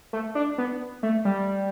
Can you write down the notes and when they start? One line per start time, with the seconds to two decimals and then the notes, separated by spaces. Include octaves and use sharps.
0.13 A3
0.35 D4
0.58 B3
1.03 A3
1.25 G3